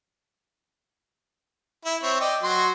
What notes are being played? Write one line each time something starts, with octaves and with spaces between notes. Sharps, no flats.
E4
C4 C#5 E5
D5 D#5 G5
F#3 F#4 C6